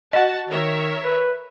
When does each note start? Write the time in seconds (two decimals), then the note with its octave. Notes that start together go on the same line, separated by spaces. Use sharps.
0.13 F#4 D#5 F#5 A5
0.49 D#3 A#4 C#5 E5
1.04 B4